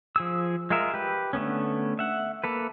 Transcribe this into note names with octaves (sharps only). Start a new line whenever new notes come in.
F3 G#4 E6
G#3 F4 G#4 A#4 E5
G4 B4
D3 A3 B3 C#4
E5 F#5
A#3 A4 B4